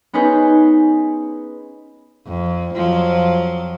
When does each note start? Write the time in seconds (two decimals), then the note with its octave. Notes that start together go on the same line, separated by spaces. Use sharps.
0.13 B3 C#4 D#4 G#4 B4 C5
2.26 F2
2.74 F2 F3 F#3